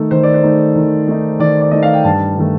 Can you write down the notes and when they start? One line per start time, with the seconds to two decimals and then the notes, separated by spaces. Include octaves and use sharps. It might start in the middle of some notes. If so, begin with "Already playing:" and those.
Already playing: D#3 A3 D#4 A4
0.11 D#3 C5
0.23 D5
0.34 C5
0.43 A3 D#4
0.75 D#3
1.08 A3 D#4
1.39 D#3 D5
1.61 D5
1.71 A3 D#4 D#5
1.83 F5
1.93 G5
2.04 G2 A5
2.37 D#3 A3